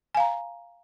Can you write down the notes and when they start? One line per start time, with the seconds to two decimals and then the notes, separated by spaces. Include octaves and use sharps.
0.15 G#5
0.17 F5
0.20 A#5